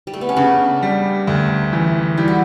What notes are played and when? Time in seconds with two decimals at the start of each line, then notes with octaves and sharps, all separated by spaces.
0.07 G3
0.14 A3
0.21 B3
0.29 C#4
0.36 C#3 D4
0.83 G3
1.27 D2
1.73 E3
2.17 G3 E4
2.28 F#4